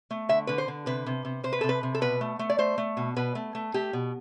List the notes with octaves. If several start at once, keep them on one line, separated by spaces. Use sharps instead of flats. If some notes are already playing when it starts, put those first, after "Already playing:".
A3
D3 E5
D3 B4
C5
D3
C3 B4
C3
C3
C3 C5
B4
C3 A4
B4
C3
A4
B2 B4
A3
A3
D5
A3 C5
A3
B2
B2 B4
A3
A3
A3 G4
B2